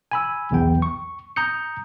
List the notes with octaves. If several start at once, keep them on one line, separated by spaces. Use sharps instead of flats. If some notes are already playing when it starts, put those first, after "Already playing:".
G#5 B5 E6
B1 E2 G5
C#6
A#5 D#6 G6 C#7